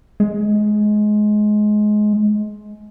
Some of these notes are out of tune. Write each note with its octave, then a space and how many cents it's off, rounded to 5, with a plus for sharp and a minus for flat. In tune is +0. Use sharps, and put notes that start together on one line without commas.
G#3 +20